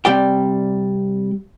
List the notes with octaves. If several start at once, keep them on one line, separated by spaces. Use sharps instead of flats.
C3 G3 D5 G5